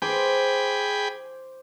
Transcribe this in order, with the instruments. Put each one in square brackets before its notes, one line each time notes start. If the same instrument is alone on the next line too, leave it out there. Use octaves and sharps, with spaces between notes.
[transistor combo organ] G#4 G5 B5 [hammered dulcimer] C5 D6